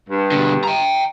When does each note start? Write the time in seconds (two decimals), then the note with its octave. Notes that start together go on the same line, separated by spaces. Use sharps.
0.09 G2
0.31 B2 D3
0.64 G5 A#5